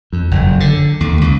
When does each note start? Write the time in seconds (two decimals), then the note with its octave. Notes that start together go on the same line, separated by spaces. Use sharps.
0.13 F2
0.31 F#1
0.60 D3
1.00 D#2
1.21 C#2